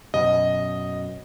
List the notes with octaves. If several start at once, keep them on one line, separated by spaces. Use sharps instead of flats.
F#2 B2 D#5